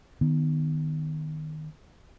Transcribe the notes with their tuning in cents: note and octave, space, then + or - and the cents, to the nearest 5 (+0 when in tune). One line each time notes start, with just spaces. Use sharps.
D#3 -15 B3 +0